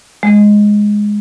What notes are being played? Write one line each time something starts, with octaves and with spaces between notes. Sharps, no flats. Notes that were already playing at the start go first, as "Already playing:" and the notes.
G#3